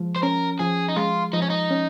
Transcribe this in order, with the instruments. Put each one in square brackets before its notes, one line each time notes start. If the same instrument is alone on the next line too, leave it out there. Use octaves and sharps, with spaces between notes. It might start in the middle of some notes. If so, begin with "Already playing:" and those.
Already playing: [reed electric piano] F3 G#3
[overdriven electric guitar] C5
[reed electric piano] C#4 [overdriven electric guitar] A#4
[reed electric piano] F3 [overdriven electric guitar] G#4
[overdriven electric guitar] D#4
[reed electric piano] G#3 [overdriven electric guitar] F4
[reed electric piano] F3 [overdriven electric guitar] D#4
[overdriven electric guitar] C#4
D#4
[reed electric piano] C#4